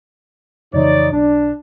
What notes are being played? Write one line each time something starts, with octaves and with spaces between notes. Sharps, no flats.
F2 C#3 E3 D#4 C#5 D5
B1 D4